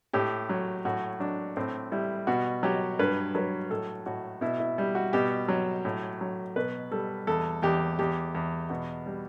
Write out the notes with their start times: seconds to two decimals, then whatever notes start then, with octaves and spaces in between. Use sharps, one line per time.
0.13 A2 G4
0.49 F#3
0.85 A2 F#4
1.20 F#3 D4
1.57 A2 C4
1.92 G3 E4
2.27 B2 F#4
2.63 F#3 G4
2.99 G2 B4
3.35 F#3 B4
3.70 A2 A4
4.06 A2 F#4
4.41 B2 E4
4.60 E4
4.78 G3
4.95 F#4
5.13 B2 G4
5.48 F#3
5.85 A2
6.21 F#3
6.56 B2 B4
6.91 G3 A4
7.27 E2 A4
7.62 E2 G4
7.99 E2 G4
8.35 E2
8.70 B2 F#4
9.06 G3